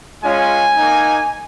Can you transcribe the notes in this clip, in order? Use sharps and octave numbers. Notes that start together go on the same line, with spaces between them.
G#3 C#4 F4 G#5
A#3 D#4